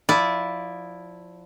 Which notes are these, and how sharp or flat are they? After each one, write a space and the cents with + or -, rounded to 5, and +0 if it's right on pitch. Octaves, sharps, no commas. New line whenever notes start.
F3 +20 E4 +0 D5 -10